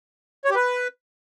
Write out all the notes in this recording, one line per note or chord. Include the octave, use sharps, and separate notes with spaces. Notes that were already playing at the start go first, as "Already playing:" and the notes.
C#5
G4
B4